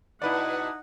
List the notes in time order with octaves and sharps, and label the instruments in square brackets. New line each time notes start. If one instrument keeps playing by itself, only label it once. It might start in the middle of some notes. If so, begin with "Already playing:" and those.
[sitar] F2 B2 [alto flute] D#4 [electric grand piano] E4 B4 D5 [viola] F#5